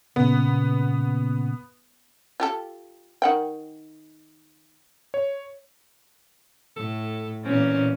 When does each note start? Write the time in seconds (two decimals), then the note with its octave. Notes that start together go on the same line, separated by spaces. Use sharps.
0.16 A#2 C#3 B3
2.40 F4 G4 A4
3.22 D#3 F#5 G5
5.14 C#5
6.77 A2 A4
7.45 A#2 E3 A#3 C4 C#4